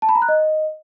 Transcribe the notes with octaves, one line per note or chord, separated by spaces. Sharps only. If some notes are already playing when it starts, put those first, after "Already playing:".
A5
B5
A#5
F#6
D#5